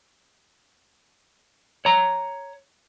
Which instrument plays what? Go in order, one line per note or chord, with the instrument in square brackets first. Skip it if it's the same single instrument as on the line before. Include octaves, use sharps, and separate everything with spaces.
[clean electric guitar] C#5 A#5